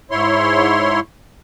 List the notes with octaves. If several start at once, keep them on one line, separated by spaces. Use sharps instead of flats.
G#2 E4 C#5 C6